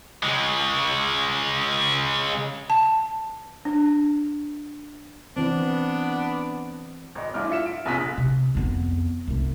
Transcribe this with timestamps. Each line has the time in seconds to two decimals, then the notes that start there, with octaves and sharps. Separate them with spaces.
0.23 C#3 G#3
2.70 A5
3.65 D4
5.37 E3 B3 C4 D4
7.15 G#1 D#5
7.34 A1 G2 E4 D6 F6
7.49 F4 E5 C#7 E7
7.66 D7
7.85 F1 A#1 C3 D#6 F#6 B6
8.17 C3
8.55 F2 B3
9.28 C2 A3